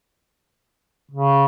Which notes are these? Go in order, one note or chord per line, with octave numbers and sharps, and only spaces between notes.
C#3